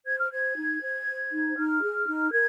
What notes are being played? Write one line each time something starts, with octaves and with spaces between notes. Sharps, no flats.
C5 G#6
F6
C5 G#6
D#4
C5
C5
D#4
D#4 F6
G#4
D#4
A#4 G#6